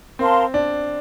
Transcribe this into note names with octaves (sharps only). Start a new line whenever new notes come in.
C4 A#4 F5 A5 C6
D4